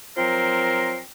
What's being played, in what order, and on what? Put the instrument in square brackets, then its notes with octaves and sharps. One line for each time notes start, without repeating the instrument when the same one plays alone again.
[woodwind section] F3 F#3 C4 A#4 C6